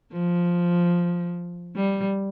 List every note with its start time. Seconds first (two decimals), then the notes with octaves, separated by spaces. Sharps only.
0.12 F3
1.76 G3